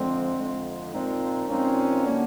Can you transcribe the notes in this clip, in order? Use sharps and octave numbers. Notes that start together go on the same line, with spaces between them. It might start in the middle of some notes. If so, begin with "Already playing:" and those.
Already playing: F2 D3 F3 G#3 C4
F2 D3 F3 G#3
A#2 F3 G#3 C4 D#4
A#2 F3 G#3 C4 C#4 D#4
D3 F#3 A#3 D4